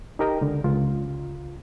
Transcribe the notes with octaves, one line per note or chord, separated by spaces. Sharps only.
D#4 G4 A#4 D#5 G5 A#5
C#2 D3
C#2 F4